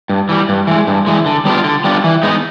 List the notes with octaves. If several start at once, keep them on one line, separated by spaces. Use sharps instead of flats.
G2
E3 G3
G2
E3 G#3
G2
E3 G#3
D3
G3 B3 D4 F4
D3
G3 B3 D4 F4
E3
G#3 B3 D#4